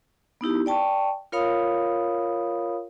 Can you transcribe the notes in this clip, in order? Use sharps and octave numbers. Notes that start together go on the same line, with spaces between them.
B3 D#4 E4 G4
D5 G5 A5 C#6
F4 A#4 C#5 F5 B5 D#6